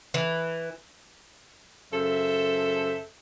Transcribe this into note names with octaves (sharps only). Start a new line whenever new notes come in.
E3
F#2 C#3 A4 C5 E5